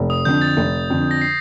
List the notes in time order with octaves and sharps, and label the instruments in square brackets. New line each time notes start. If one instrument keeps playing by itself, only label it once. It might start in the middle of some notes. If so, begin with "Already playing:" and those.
Already playing: [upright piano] F1
[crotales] D#6
[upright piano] F2 D3 [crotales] G6
[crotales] A6
[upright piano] F1
F2 D3
[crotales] A#6
C7